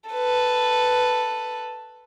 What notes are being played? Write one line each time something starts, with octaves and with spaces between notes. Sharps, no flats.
A4 B4